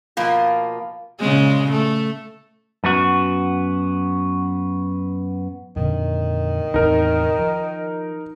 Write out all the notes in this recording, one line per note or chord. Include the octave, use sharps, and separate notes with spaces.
B2 F3 A#3 F4
A#2 C#3 G#3
A3
F#2 B3 F#4
F2 A#2 D3 D#3
E2 A2 C3 D#4 A#4
F3